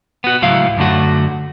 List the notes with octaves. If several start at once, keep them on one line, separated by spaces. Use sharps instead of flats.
B3 F#4
C#2 A2 F#3 E4 F5
F#2 D3 A3 F#4